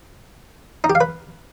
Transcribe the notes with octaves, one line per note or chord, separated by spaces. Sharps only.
D#4
G4
F5
B4